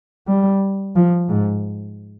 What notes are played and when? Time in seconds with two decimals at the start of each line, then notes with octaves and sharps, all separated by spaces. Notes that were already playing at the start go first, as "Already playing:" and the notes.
0.27 G3
0.96 F3
1.29 G#2